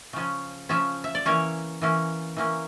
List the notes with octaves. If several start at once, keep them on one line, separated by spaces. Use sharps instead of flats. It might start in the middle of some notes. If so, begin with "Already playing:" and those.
C#3 F3 C#4
C#3 F3 C#4 E5
E5
D5
E3 A#3 C#4 C#5
E3 A#3 C#4
E3 A#3 C#4